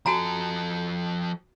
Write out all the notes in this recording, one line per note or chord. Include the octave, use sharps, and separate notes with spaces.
F3 F#4 A4 G#5 A#5